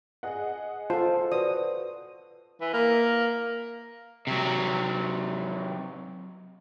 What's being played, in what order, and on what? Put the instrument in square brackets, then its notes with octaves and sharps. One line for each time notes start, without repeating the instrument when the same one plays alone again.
[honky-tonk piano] G#4 D#5 F#5
[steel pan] F4 A4 [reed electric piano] C5 [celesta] A5
[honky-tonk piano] F#4 [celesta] B4 D5 [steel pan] D#6
[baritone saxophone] E3
A#3
[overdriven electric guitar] C3 F#3